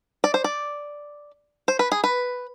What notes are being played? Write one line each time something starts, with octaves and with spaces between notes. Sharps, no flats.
D5
C5
D5
C5
B4
G#4
B4